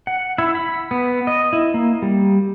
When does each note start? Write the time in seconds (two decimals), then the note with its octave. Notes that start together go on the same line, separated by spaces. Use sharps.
0.07 F#5
0.38 E4
0.55 B5
0.91 B3
1.27 D#5
1.53 E4
1.74 A#3
2.02 G3